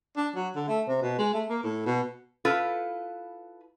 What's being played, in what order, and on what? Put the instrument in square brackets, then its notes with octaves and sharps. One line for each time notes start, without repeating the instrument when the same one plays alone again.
[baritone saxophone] D4
F#3
D3
A3
C3
B2
G#3
A3
A#3
A2
B2
[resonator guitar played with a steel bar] E4 F4 A4 B4